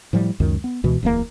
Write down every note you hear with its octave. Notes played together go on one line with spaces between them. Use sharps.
A2 F3 G3
C#2 F#2 D#3
B3
C#2 B2 E3
D1 E2 A3 A#3